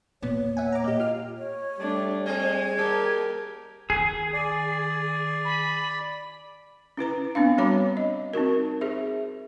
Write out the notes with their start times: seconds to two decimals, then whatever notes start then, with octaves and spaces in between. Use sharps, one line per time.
0.22 E2 A#2 B3 C#5
0.57 E5 F#5 G#5
0.72 A#5 D6
0.84 A#3 G4 D#5
1.00 F4 F6
1.38 C#5
1.79 G3 A3 D4
2.26 G#3 C4 D#5 G#5 G#6
2.78 A#3 G4 A#4
3.90 D#3 G#4
4.33 D5
5.45 B5
6.97 C#4 E4 B4 A#5
7.35 B3 C4 D4 F5
7.58 G3 F#4 C#5 A#5 B5 D6
7.97 D#5
8.34 C4 D#4 F#4 A#4
8.81 G#4 C5 E5